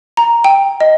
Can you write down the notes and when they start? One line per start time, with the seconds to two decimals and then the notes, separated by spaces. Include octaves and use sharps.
0.17 A#5
0.44 G5
0.80 D#5